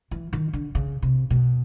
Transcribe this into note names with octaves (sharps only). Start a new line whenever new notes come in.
E3
D#3
D3
C#3
C3
B2